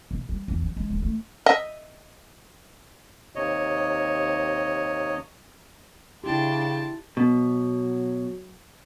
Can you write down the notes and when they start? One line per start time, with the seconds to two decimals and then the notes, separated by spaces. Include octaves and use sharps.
0.11 B2
0.29 G3
0.48 E2
0.62 F#3
0.77 G#3
0.90 D1
1.02 A3
1.46 D#5 E5
3.35 D#2 C3 C#5 D#5
6.24 C#3 D4 E4 G4 G5 A5 C6
7.17 B2 F#3